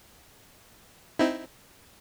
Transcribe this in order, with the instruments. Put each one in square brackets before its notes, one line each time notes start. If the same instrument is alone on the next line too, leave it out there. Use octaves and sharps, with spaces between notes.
[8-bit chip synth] C4 D#4 E4